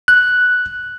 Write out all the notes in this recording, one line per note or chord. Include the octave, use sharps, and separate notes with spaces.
F#6